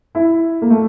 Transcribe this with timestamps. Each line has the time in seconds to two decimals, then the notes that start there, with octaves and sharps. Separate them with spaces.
0.15 E4
0.62 A#3
0.70 A3